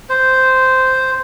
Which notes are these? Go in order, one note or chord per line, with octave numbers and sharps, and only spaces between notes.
C5